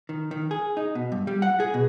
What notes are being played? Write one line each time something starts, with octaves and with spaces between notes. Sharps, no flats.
D#3
D#3
G#4
D#4
B2
G2
G3
F#5
G#4
B2